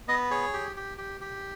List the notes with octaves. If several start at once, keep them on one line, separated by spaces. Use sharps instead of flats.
B3 D#5
G#4 C#5
G4
G4
G4
G4